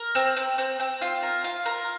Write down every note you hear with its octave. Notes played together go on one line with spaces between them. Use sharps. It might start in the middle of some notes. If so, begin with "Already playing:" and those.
Already playing: A#4
C4
C4
C4
C4
F4
A#4
F4
A#4